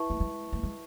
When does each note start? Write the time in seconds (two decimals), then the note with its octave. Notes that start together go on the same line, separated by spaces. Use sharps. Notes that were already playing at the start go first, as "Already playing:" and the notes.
Already playing: E4 B4 E5 A5 C#6
0.10 A3
0.20 G#3
0.53 A3
0.63 G#3